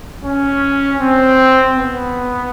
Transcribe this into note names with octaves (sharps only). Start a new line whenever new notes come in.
C#4
C4
B3